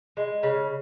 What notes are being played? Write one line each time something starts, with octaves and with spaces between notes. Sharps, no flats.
G#3
C#3